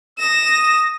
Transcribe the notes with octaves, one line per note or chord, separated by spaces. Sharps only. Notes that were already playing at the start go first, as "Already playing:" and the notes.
D#6 A#6 E7